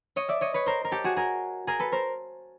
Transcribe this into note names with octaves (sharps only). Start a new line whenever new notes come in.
C#5 D#5
D5 E5
C#5 D#5
B4 C#5
A#4 C5
A#4
G4 A4
F#4 G#4
G#4 A#4
G#4 A#4
A4 B4
A#4 C5